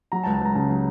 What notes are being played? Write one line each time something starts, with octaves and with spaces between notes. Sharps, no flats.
F#3 A#5
C#2 A5
A5
C#2 A#5
C#3 A5
F#3